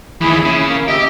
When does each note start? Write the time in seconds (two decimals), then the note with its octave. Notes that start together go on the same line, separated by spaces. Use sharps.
0.21 D#2 E3 E4 G#4 B5
0.45 C#3
0.68 A#3
0.88 G4 D#5 E5